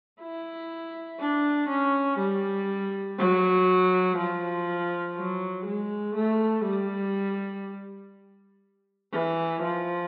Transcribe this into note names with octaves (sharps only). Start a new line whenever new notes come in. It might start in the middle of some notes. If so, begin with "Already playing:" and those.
E4
D4
C#4
G3
F#3
F3
F#3
G#3
A3
G3
E3
F3